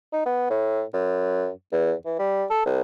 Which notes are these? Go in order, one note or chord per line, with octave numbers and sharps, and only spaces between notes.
D#4
B3
A2
F#2
E2
E3
G3
A4
C2